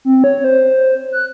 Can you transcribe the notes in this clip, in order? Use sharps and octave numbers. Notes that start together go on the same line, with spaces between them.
C4
C#5
C5
F#6